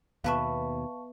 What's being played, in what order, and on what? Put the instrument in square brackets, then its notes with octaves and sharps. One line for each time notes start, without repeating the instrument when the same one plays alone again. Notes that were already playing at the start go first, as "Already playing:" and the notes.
[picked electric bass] D#2 B2 [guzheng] B3 B4 E5 [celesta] F5 A5 C#6